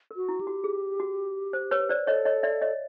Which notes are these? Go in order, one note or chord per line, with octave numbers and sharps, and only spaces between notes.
A#4
F#4
E4
G4
F#4
G#4
F#4
C5
B4 C#5
C5 D5
A4 C#5 D#5
C#5 D#5
D5 E5
C#5 D#5